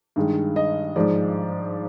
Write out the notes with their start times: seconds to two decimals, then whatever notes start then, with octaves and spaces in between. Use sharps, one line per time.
0.16 G2 D#3 G#3
0.56 D#5
0.96 G#2 F3 G#3 D5